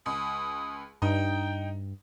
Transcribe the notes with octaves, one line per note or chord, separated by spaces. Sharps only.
C#2 D#6
G2 D#4 G5